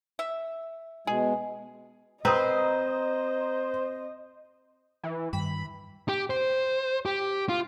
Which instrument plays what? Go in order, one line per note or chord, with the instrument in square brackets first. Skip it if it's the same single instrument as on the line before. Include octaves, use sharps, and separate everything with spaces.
[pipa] E5
[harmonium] B2 G#3 [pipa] G#4
[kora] C4 B4 [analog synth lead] C5 [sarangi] D#5 [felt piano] A#5 D#6
[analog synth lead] E3
[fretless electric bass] G2 [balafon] D#3 G5 [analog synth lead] B5
[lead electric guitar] G4
C5
G4
F4